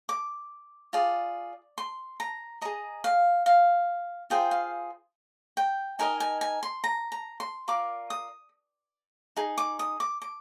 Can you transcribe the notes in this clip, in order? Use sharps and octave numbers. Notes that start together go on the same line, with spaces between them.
D6
F4 G#4 D5
C6
A#5
G#4 D#5 A#5
F5
F5
F4 G#4 C5 G5
F5
G5
D#4 A#4 D#5 G#5
G#5
G#5
C6
A#5
A#5
C6
F4 A#4 D5 D6
D#6
D#4 G#4
D6
D#6
D6
D6